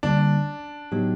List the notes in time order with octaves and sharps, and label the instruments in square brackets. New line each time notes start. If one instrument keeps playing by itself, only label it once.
[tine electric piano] D3 G3 A#3 [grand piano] D4
[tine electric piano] A2 F#3 B3 D#4 G4